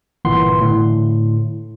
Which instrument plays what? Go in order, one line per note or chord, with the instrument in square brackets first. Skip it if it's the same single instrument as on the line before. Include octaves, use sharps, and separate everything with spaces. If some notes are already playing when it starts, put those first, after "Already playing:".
[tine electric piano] G1 A#2 E3 B3 C6
A2 D3